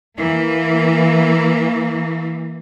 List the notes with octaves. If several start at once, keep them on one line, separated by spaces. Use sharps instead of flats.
E3 A#3